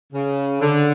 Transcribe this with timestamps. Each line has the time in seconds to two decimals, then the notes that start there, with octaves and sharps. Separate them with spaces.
0.13 C#3
0.61 D3